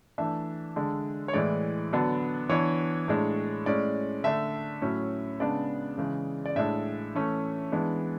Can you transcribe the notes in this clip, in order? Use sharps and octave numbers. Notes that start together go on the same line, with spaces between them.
E3 A3 D4 E5
D3 G#3 D4
C#5
A2 E3 G#3 D5
D3 F#3 B3 D4
E3 B3 D4 C#5
A2 G#3 D4
A2 G#3 C#4 D5
D3 A3 D4 E5
A2 F#3 C#4
C#3 G#3 B3 D4 D5
C#3 E3 G#3
D5
A2 G#3 D4 E5
E3 A3 C#4
E3 G#3 B3 D4